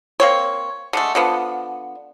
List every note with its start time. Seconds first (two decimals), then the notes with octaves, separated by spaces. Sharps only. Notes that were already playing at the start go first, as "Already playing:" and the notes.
0.20 A#3 C4 C#5
0.93 D3 G#3 A3
1.15 D3 F3 B3